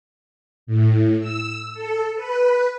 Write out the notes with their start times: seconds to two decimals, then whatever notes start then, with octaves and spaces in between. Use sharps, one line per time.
0.67 A2
1.20 E6
1.74 A4
2.16 B4